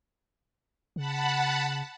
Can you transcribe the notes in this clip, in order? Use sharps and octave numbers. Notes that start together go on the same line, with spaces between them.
C#3 F#5 A5 B5